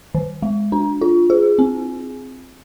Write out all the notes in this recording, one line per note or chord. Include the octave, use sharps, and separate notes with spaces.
D#3
G#3
D4
F4
G#4
C4